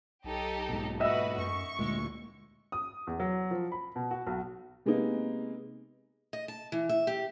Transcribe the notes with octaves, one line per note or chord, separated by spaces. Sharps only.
B1 D#4 G4 A4
G#2 B2
F#4 B4 D#5 E5 E6
F#2 C#6
D2 A#2 G#3
D#6
E2
F#3
F3
B5
B2
F#4
B1
C3 G#3 A#3 B3 D#4
D#5
A5
E3
E5
G4